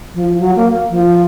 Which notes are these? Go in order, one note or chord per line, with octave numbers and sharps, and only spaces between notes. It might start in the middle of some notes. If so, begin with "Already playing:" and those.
F3
F#3
A#3
F3